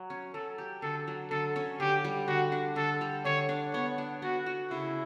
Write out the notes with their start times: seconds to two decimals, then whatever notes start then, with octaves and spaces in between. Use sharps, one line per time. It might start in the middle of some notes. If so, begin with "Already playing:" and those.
Already playing: F#3
0.10 C#4
0.34 F#3 A4
0.58 G4
0.82 D3 A4
1.08 F#3
1.31 D3 A4
1.56 C#4
1.80 D3 G4
2.05 G3
2.28 D3 F#4
2.52 D4
2.76 D3 A4
3.01 G3
3.25 D3 C#5
3.49 D4
3.74 B3 C#5
3.98 D4
4.22 B3 F#4
4.46 F#4
4.71 C#3 E4